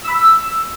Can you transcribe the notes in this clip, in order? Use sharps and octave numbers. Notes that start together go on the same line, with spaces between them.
E6
B5
E6